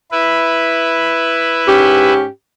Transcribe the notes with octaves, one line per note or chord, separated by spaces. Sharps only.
E4 B4
G#2 C#4 G4